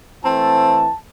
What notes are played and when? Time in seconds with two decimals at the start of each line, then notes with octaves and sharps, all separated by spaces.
0.23 E3 A3 C4 A5